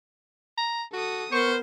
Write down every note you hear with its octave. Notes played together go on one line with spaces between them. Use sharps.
A#5
F#4 A4 D#6
B3 A#4 C5 C#6